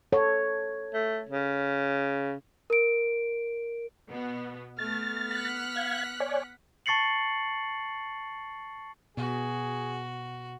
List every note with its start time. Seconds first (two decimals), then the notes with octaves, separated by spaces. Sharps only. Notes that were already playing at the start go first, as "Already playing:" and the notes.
0.12 A4 C#5
0.94 A3
1.29 C#3
2.70 A#4 D7
4.10 B2 B3
4.79 A3 B3 F6 A6
5.31 F#5 F#6 B6
5.76 F5 G#6
6.20 C#5 D5 G#5
6.86 A5 C#6 A6 C7 C#7 F#7
9.17 B2 F#4 G#4